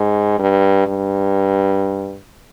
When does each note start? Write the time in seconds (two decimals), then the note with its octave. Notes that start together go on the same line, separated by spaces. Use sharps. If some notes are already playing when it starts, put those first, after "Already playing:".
Already playing: G#2
0.39 G2
0.87 G2